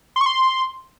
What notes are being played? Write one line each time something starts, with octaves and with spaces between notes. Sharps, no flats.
C6
C#6
C6